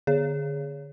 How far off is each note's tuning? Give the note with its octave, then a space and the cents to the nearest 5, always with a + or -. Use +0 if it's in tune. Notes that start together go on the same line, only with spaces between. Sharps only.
D3 +0 G#4 +0 C#5 +30